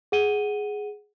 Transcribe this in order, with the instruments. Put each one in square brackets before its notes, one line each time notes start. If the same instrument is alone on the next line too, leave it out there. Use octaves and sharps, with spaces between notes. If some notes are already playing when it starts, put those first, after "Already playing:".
[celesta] G#4 F#5 D#7 G7